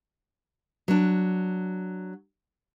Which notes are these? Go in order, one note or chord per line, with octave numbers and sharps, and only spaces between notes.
F#3 D4